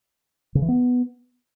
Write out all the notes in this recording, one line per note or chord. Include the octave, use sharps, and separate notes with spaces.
C#3
E3
B3